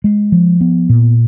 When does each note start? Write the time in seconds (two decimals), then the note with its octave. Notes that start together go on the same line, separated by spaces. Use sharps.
0.04 G#3
0.32 F3
0.61 B3
0.89 A#2